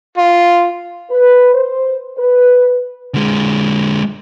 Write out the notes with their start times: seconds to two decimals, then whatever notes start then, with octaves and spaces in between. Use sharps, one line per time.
0.17 F4
1.10 B4
1.54 C5
2.18 B4
3.15 D3 G#3